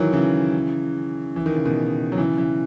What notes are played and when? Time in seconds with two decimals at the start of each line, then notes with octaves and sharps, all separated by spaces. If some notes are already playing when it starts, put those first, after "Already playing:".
Already playing: D#3 E3 F#3
0.13 C#3 E3
1.36 E3
1.46 D#3
1.55 C#3
1.66 B2 D#3
2.12 F#3
2.18 C#3 E3
2.38 C#3 E3